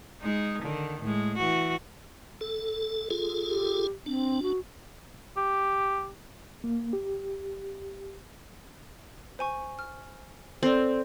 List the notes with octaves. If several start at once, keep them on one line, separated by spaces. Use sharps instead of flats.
G#3 D#4
D3 D#3
A2 G#3
E3 F#4
A4
F4 G#4 A4
G4
C4 D4
F#4
G4
A#3
G4
C5 G#5 C#6
F6
C4 A4 D5